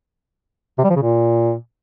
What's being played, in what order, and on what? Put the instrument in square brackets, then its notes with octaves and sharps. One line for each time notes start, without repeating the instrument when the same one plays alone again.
[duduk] C3
G3
F3
C#3
A#2